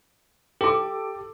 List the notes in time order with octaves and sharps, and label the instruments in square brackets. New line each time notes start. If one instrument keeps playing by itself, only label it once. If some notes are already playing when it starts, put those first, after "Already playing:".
[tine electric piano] G4 [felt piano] A4 D6